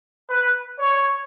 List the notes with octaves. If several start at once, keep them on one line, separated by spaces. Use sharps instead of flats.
B4
C#5